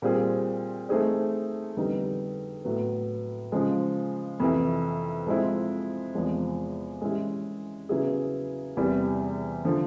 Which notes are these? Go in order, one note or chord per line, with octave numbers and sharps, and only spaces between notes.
A#2 G3 C4 F4 G#4
A3 C4 D#4 G#4 C5
F2 D3 G3 B3 D#4
A2 F#3 B3
C#3 F3 G#3
F2 C3 E3
F3 G#3 C4 E4
E2 C3 F3 G#3
G#3 C#4 E4 G4
C#3 F#3 B3 E4 G#4
E2 C3 E3 G3
D3 F3